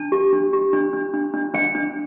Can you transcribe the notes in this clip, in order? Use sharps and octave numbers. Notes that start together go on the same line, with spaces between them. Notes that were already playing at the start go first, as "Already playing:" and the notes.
Already playing: D4 A5
G4
D4
G4
D4
D4
D4
D4
D4 G5
D4